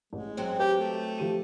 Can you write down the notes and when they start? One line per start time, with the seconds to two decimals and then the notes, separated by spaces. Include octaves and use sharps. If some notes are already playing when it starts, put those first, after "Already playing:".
0.13 A1 G#3
0.37 F#3 C4 C#4
0.59 G4 B4 G5
0.79 A3
1.18 F3 G4 D#7